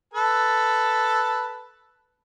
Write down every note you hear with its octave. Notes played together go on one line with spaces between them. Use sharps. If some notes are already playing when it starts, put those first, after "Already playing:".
A4 B4 A5